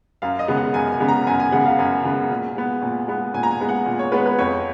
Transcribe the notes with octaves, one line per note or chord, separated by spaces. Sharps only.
F#2 F5
D#5
C#3 G#3 B3
F#5
F#2 G#5
G#5
C#3 G#3 B3
A#5
F#2 G#5
G#5
C#3 G#3 B3 F#5
F5
F#2 G#5
C#3 G#3 B3
A#2
G#3 B3
A#2
G#3 B3
A#2 G#5
A#5
G#5
G#3 B3
F#5
A#2
C#5
G#3 B3 B4
B4
F2 C#5